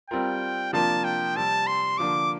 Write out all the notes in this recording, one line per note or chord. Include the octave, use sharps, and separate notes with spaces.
G3 C4 F4 A#4 G5
C3 F3 A#3 D4 F4 A5
G5
C3 G3 C4 A5
C6
D3 F3 A#3 D4 D6